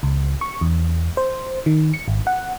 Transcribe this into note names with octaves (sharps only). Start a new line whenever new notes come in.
C#2
C#6
E2
C5
D#3
C#7
G#1
F#5